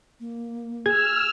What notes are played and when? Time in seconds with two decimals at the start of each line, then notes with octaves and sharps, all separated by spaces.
0.20 A#3
0.86 G#4 E6 F6 G#6